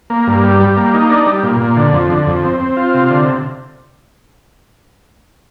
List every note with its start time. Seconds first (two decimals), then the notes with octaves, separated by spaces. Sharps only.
0.10 A#3
0.27 G2
0.43 G3
0.60 G3
0.77 A#3
0.94 D#4
1.10 D4
1.26 G3
1.43 A#2
1.60 A#2
1.77 D3
1.93 F2
2.10 D3
2.27 F2
2.44 C4
2.60 C4
2.77 F4
2.94 C3
3.10 D3